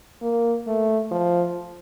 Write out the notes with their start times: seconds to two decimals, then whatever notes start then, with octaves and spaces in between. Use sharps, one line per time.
0.22 A#3
0.67 A3
1.12 F3